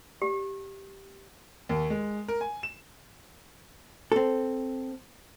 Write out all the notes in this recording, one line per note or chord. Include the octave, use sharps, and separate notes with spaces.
G4
D#2
G#3
A#4
G#5
E7
C4 A4